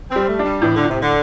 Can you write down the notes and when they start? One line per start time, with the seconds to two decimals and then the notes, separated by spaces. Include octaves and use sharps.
0.10 C4
0.16 G3
0.28 A3
0.39 D4
0.45 G3
0.62 A2 E3
0.75 D3
0.85 A2 C3
1.02 D3